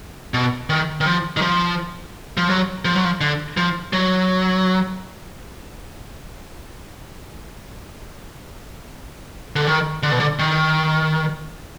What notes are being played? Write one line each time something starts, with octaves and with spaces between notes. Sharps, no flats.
B2
D#3
D#3
F3
D#3
F3
F3
F#3
F3
F#3
F3
D3
F3
F#3
D3
D#3
D3
B2
D3
D#3